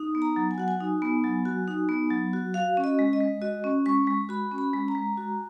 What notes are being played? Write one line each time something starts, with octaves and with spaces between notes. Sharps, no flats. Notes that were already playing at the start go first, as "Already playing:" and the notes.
Already playing: D#4
B3
A#5
F#3
G#5
F#4 F#5
G#5
D#4
B3
F#3
F#4
D#4
B3
F#3
F#4
F#4 F5
C#4
D#5
G#3
D#5
G#3
F#4 D#5
C#4
G#3 C#6
G#3
F#4 B5
C#4
B5
G#3
A#5
G#3
F#4